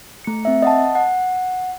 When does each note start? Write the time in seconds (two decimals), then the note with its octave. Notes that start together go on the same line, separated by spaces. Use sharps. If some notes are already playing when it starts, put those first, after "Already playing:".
0.24 A3 C#7
0.45 C4 E5
0.62 D#5 F#5 A5
0.95 F#5